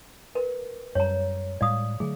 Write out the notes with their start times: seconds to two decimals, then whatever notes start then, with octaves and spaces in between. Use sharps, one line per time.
0.35 A#4 B4
0.95 F#2 G3 C#5 A#5
1.61 A2 G3 G#3 D5 F5 D#6
2.00 D3 F#3 A3 G#4